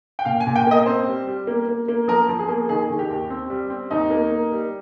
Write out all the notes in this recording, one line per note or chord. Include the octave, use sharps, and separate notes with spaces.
G5
A#2 F5
G#5
A#2
G5
A#3 D#5
C4 C5
G3
G3
A#3
A#3
A#3
F3 A#4
F3
G#4
A#3
D#3 G#4
D#3
G4
D#2
C4
G3
C4
D#2 D#4
A#3
A#3
G3